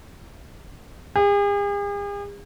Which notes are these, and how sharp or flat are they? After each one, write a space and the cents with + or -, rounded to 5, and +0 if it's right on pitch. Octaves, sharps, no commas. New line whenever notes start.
G#4 -45